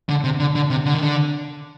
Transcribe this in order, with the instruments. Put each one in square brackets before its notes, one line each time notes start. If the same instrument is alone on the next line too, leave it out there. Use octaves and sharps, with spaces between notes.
[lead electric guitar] D3
C3
D3
D3
C3
D3
D#3
D3